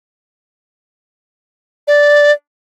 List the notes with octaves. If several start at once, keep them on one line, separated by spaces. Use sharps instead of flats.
D5